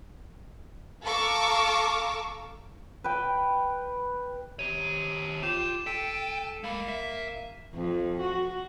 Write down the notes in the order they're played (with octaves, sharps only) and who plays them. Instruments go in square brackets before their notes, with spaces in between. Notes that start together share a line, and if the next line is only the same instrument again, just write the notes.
[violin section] A4 F5 A#5 C#6 D6 E6
[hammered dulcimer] B4 G5
[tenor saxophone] C3 [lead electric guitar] D#3 C#5 [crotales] D#7
[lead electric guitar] F4 [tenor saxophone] G4 [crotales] E7
[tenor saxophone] A4 [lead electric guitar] G5 [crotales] B6 D#7 E7
[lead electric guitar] G#3 B5 [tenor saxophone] A#3
[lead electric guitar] E5 [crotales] B6
[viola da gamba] F2
F#4